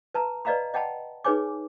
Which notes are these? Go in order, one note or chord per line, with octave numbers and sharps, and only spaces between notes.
B4 A5 A#5
B4 D5 D#5 F5 A#5 B5
D#5 F#5 G5 A5 B5
D#4 G#4 B4 C#5 G#5 D6